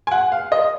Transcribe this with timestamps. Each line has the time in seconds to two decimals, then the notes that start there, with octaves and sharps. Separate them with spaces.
0.07 G#5
0.11 F#5
0.32 F5
0.52 D#5